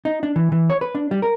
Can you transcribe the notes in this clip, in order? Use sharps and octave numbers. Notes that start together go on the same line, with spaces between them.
D#4
D4
E3
E3
C#5
B4
D4
G3
A#4